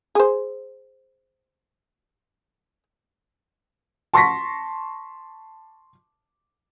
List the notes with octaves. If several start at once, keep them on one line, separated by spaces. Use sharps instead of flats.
G#4 C5
A5 C6 C#6 A#6 B6